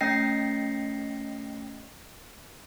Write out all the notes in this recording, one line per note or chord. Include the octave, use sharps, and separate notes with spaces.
A3 C#4 D#5 G5 A#6 C7